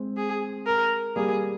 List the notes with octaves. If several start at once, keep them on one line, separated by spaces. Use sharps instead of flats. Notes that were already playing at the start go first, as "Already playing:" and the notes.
Already playing: G#3 C4
G#4
A#4
G3 A#3 G#4